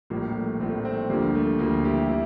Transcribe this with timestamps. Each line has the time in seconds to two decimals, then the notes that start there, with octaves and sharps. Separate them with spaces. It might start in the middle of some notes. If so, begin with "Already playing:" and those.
0.10 A#1 A2 F3 G3 A#3
0.35 A3
0.60 A#1 A2 F3 A3 C4
0.84 A3 C4
1.10 D2 D3 F3 G3 A#3
1.35 A3
1.59 D2 D3 F3 G3 A#3
1.84 E4 G4
2.09 E4 G4